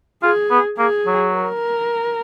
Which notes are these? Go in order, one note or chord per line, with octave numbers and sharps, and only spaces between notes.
F4 G#4
B3
A#3 G#4
F#3
A#4